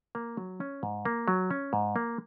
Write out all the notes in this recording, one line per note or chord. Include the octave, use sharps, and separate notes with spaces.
A#3
F#3
C#4
G#2
A#3
F#3
C#4
G#2
A#3